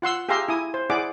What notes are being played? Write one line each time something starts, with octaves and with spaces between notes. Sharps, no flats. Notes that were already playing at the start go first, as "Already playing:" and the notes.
F4 F#5 C6 E6
G4 G#4 E5 F5 A#5 C6
E4 G#5 D#6
C5
E4 G#4 D5 F#5 D6